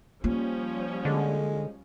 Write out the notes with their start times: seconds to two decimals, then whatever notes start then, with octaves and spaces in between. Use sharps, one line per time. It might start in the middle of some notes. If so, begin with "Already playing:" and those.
0.24 F3 G3 A#3 C#4 F4
1.05 D3 G#3